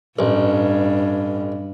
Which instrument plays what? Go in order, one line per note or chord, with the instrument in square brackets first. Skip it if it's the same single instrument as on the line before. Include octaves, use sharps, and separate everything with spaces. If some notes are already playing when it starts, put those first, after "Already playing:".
[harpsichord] A1 [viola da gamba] G2